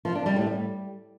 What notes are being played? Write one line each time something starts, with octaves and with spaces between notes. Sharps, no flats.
F3
D4
G3
A2
G3